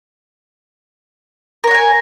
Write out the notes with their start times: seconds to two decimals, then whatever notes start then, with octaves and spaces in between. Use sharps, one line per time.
1.64 A#4
1.67 C#5
1.71 F#5
1.74 G#5